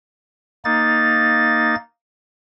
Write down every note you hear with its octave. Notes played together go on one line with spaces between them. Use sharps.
A#3 D#4 A6